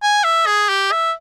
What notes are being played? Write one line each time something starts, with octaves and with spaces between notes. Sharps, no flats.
G#5
E5
G#4
G4
E5